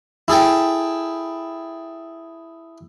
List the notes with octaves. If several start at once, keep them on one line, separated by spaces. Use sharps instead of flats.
E4 G#4 A4 G5